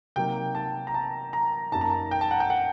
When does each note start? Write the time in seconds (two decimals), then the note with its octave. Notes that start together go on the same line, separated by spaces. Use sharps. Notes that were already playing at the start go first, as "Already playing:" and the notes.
0.16 C3 F#3 A#3 D#4 G5
0.55 A5
0.87 A#5
0.94 A5
1.33 A#5
1.72 F#2 F#3 A#3 D#4 A5
1.81 A#5
1.90 A5
2.11 G5
2.21 A5
2.31 F#5
2.40 G5
2.50 F#5